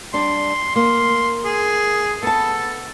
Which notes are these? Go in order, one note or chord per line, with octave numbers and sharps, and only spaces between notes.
G3 D4 C6
A#3 C6
G#4
B3 A4 A5